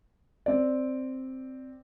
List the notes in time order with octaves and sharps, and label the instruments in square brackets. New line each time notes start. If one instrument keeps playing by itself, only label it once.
[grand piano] C4 D5